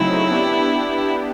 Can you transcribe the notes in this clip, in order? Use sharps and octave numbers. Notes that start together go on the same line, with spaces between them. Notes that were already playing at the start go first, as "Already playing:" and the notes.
Already playing: C#3 F#3 A3 C4 D#4 E4
B3 D4 G4